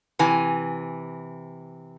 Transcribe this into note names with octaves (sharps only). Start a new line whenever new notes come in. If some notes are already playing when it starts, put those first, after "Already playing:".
C3 E3 G#5